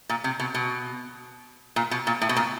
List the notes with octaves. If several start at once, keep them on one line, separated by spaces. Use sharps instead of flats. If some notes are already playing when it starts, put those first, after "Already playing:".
A#2
C3
B2
B2
A#2
B2
A#2
A2
B2
A#2